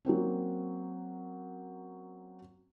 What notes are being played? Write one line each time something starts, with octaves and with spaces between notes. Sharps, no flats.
F#3 A#3 C4 C#4